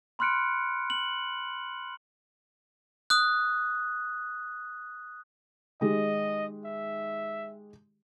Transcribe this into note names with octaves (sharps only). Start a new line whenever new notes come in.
B5 C6 F6 F#6 C#7 D7
F#7
D#6 F#6
D#3 G#3 G4 D#5
E5